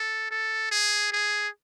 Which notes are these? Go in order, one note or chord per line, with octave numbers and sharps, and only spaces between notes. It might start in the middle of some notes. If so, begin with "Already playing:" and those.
Already playing: A4
A4
G#4
G#4